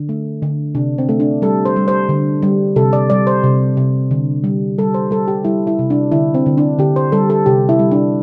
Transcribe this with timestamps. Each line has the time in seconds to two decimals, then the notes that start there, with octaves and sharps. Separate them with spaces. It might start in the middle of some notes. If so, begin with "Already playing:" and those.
Already playing: D3
0.09 A3
0.42 D3
0.75 C3 D4
0.98 C4
1.09 A3
1.20 D4
1.42 G3 A4
1.65 C5
1.76 G3
1.88 C5
2.09 D3
2.43 G3
2.76 C3 A4
2.93 D5
3.10 G3 D5
3.27 C5
3.44 C3
3.77 C3
4.11 D3
4.44 G3
4.78 G3 A4
4.94 C5
5.11 G3 A4
5.28 G4
5.45 G3 E4
5.67 E4
5.79 C3
5.90 D4
6.12 D3 E4
6.34 C4
6.46 D3
6.57 D4
6.79 D3 G4
6.96 C5
7.12 G3 A4
7.30 A4
7.46 C3 G4
7.69 E4
7.79 G3
7.91 D4